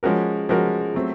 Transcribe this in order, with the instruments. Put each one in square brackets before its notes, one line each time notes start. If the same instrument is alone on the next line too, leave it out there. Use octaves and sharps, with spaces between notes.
[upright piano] F3 G#3 C#4 F#4 A#4
F3 G#3 C#4 F#4 A#4
F#3 A3 C4